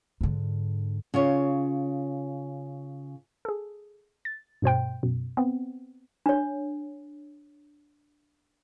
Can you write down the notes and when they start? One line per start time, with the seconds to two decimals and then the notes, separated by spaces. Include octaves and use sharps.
0.21 G#2 D3
1.14 C#3 F4 C#5
3.45 G#4 A4
4.25 A6
4.62 G2 B2 C5 G5
5.03 F#2 B2
5.37 B3 C4
6.26 D4 C#5